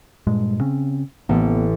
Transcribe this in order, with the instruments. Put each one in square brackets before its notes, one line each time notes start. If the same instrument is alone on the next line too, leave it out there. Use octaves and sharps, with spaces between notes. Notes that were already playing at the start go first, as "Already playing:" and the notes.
[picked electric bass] G2 A#2 G#3
C#3 C4 C#4
[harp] A1 [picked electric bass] A#3 B3